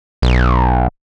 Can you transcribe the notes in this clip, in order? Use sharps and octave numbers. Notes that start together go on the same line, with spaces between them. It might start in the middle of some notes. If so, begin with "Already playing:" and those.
B1